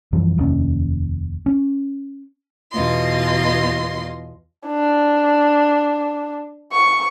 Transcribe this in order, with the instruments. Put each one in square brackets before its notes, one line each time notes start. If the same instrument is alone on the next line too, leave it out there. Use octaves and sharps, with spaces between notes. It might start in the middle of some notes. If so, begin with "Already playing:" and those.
[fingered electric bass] F#2 E3 F3 G3
F1 D#2 C#4
C#4
[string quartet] E2 B2 F4 D#5 C6
[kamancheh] D4
C#6